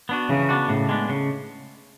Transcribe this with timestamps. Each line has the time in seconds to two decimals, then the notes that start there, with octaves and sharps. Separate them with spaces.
0.09 B3 D4 F#4
0.29 C#3 E3
0.49 B3 D4 F#4
0.68 A2 C#3
0.89 G#3 B3 D4
1.09 C#3